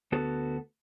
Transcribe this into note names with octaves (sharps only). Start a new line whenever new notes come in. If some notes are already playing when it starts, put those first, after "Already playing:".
D2 B3 F#4 A4